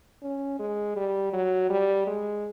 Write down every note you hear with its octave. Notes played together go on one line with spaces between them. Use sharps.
C#4
G#3
G3
F#3
G3
G#3